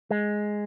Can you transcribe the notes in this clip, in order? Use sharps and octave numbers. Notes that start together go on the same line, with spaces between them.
G#3